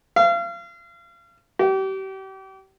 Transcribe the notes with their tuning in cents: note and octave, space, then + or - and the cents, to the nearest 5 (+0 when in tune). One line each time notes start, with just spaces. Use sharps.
F5 -35
G4 -35